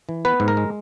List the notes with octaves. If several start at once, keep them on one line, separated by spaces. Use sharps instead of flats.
E3
B3 B4
G#2
A#4
G#3